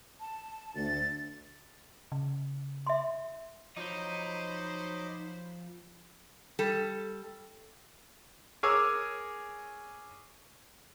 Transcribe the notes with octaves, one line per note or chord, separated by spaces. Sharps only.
A5
D2 A6
C#3
E5 C6
F3 F#3 D#4 C5 D#5 B5 D6
G3 A4
G#4 A#4 C#5 G#5 D6 E6